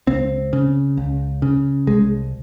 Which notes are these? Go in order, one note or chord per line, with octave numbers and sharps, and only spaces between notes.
C#2 C4
C#3
C#2
C#3
C2 G#3